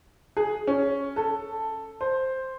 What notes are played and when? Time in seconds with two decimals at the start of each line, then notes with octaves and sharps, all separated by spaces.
0.37 G#4
0.67 C#4
1.16 A4
2.01 C5